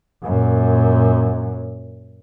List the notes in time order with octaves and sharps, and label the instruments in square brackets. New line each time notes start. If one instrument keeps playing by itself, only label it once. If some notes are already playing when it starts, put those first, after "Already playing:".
[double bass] F#2 A#2